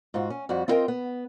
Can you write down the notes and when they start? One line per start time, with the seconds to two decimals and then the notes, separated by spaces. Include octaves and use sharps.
0.14 G#2 F4 F#4
0.30 C#4
0.49 F2 G3 F#4
0.68 C4 E4 F4 A#4 D#5 G5
0.88 B3